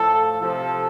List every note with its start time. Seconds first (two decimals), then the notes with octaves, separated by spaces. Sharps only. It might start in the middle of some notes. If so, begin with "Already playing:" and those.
Already playing: A2 F3 A4
0.41 C3 F3 A4